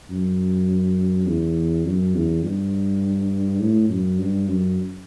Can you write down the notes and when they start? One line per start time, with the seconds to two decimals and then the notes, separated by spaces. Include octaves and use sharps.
0.11 F#2
1.27 E2
1.86 F#2
2.15 E2
2.44 G2
3.61 A2
3.90 F#2
4.19 G2
4.48 F#2